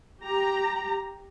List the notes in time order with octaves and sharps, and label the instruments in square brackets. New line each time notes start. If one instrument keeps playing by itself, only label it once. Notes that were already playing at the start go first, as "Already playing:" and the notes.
[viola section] G4 A#5